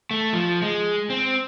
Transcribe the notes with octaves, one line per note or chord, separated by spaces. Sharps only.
A3
F3
G#3
C4